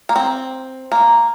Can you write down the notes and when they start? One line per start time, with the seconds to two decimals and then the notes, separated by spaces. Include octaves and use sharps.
0.09 A#3
0.16 C4
0.92 A#3